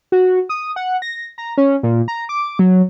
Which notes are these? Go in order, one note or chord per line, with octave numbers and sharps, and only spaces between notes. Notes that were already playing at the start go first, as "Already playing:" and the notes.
F#4
D#6
F#5
A#6
A#5
C#4
A#2
A#5
D6
F#3